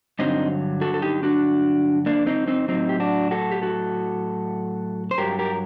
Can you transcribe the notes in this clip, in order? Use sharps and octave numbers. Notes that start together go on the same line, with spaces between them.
G2 D3 F#3 C4 D#4
F#4 A4
A4
D#4 G4
D4 F#4
A#3 D4
C4 D#4
C4 D#4
A2 F#3 C4 D#4
G4
D4 F#4
F#4 A4
G4
F#4 A4
C5
G2 F#3 G4 A#4
G4 A#4